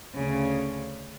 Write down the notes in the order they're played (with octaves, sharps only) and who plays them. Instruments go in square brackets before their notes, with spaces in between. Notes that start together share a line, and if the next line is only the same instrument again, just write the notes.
[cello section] D2 C#3